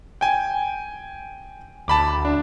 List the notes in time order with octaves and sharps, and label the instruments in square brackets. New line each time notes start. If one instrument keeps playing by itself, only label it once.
[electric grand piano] G5 G#5
[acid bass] D2 [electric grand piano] A5 B5 D6
[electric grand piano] D4